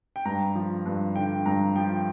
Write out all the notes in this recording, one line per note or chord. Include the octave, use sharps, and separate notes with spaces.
G5
G2 A#5
F3
G2
D3 G5
G2 A#5
F3 G5